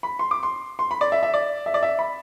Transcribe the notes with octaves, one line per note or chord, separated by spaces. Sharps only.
B5
C6
D6
C6
C6
B5
D5
E5
E5
D5
E5
D5
E5
B5